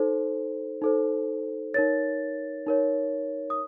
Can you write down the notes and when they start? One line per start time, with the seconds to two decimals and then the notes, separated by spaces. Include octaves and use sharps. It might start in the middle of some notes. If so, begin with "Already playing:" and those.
Already playing: D#4 A4 C5
0.82 D#4 A4 C5
1.74 D#4 A#4 C#5 A6
2.67 D#4 A#4 C#5
3.50 D#6